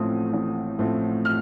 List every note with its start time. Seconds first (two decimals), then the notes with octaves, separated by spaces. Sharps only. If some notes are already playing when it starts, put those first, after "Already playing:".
Already playing: A1 A2 F3 A3 C4 D#6
0.33 A1
0.79 A2 F3 A3 C4
1.25 F6